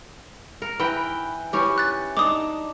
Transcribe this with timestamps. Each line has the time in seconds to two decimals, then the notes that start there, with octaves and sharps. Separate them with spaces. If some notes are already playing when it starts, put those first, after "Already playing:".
0.62 A#4
0.80 E3 B4 G5
1.53 E3 C#4 G4
1.78 F#6 A6
2.17 D4 D#4 D6 D#6